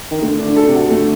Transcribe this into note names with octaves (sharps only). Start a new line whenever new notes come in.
D#3
D3 A3
D4
D3
A4
C3
F#4
D3 A3